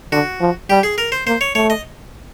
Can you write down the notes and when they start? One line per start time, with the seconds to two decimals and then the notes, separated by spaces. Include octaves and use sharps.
0.12 D3 F#4
0.41 F3
0.70 G3 G4
0.83 G#4
0.98 A#4
1.12 C5
1.26 A#3 C5
1.41 C#5
1.55 A3 C#5
1.70 D#5